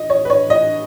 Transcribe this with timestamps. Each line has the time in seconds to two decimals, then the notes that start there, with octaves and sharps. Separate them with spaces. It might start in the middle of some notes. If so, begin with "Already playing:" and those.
Already playing: D#5
0.10 C#5
0.25 B4
0.30 C#5
0.50 D#5